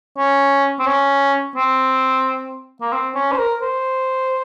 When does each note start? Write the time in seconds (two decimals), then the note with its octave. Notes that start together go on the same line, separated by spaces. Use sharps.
0.18 C#4
0.80 C4
0.87 C#4
1.56 C4
2.81 A#3
2.93 C4
3.15 C#4
3.32 C5
3.39 A#4
3.62 C5